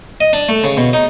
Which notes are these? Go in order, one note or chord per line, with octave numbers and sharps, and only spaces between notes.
D#5
D4
A3
C#3
B2
D#4